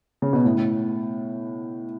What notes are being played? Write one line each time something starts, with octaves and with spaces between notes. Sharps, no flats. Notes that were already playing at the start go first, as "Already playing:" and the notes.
C#3
B2
A2